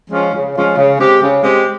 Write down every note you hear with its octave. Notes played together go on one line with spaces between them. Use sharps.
F3 G#3 C#4 F4
C#3
F3 G#3 C#4 F4
C#3
G#3 C4 G4
C#3
G#3 C4 G4